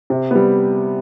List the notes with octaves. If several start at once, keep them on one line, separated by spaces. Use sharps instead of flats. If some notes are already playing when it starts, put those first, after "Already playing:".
C3
G3 B3